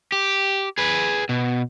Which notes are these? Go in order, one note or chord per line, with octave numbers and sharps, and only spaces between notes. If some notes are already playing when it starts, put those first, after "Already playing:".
G4
G#4 B4
B2